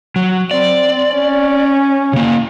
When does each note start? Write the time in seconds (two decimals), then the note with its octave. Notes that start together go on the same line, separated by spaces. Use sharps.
0.16 F#3
0.51 C4 D5
1.15 C#4
2.13 C#3 A#3